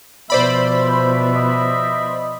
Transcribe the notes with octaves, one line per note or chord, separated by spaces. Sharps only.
B2 F3 C5 D5 E5 B5
D#5